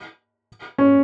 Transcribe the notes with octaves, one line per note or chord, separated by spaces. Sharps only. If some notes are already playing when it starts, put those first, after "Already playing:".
C#4